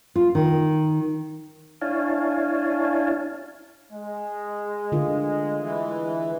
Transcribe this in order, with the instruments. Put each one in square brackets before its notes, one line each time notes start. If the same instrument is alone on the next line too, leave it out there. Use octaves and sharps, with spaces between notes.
[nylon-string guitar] F4
D#3
[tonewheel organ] D4 E4 C#5 F5 G#5 A5
[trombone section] G#3
[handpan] D3 F4 A#4
[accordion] E3